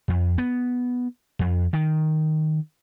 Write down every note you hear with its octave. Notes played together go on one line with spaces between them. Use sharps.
F2
B3
F2
D#3